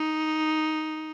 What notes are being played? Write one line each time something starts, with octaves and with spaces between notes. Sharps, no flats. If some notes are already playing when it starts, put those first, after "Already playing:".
Already playing: D#4